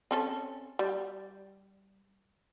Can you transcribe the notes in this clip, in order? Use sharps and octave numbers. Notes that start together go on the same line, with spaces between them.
C4 C#4 A4
G3